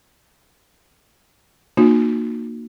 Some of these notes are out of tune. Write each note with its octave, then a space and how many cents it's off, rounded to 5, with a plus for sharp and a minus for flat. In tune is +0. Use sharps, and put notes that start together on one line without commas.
A#3 +0 D#4 -40 F#4 -40